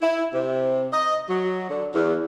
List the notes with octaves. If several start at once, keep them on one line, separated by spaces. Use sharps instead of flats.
E4
C3
D#5
F#3
D3
E2